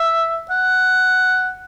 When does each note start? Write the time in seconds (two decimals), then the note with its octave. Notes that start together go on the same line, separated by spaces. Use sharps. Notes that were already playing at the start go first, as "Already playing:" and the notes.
Already playing: E5
0.51 F#5